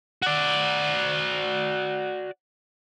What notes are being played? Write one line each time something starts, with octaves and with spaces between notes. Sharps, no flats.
F#4 D5